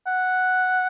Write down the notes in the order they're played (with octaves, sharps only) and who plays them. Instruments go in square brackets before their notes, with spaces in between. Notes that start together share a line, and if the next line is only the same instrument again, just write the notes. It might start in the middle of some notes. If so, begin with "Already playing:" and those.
[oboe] F#5